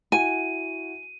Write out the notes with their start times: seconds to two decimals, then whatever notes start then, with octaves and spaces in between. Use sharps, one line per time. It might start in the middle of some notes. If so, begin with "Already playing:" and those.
0.12 E4 F#4 F#5 G#5 D#7